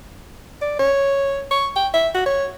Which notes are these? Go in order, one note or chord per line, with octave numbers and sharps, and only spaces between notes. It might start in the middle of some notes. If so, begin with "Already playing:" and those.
D5
C#5
C#6
G5
E5
F#4
C#5